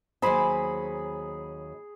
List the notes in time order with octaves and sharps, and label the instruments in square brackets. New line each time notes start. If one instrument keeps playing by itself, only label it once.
[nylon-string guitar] D#2 F#3 C5 [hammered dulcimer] G#4 B5